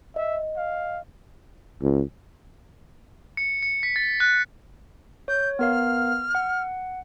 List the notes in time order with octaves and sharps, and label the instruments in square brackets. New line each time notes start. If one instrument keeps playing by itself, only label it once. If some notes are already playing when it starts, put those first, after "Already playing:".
[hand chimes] D#5 [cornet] E5
[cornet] F5
[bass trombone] C#2
[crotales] C#7
C#7
B6
A6
F#6
[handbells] C#5 [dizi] G6
[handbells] B3 A#4 F5 [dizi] F6
[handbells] F#5